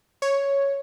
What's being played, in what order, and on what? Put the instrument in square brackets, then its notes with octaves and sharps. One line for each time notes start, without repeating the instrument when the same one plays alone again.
[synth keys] C#5